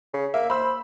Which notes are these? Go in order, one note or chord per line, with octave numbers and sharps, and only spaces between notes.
C#3
A#3 E5
C5 B5 E6